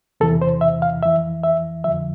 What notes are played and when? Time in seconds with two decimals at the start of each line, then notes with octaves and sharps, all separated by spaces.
0.20 E2 C3 E3 A4
0.42 C5
0.61 E5
0.82 F5
1.02 F2 E3 E5
1.43 E5
1.84 F2 D3 F3 E5